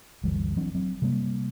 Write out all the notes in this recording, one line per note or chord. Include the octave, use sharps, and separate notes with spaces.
G1 D2 E3 G3
E3 F#3 C4 D4
F#3 C4
C3 G3 A#3